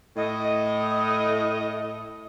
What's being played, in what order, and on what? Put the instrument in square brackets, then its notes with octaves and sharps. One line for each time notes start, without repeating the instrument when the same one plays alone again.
[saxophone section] A2 D#5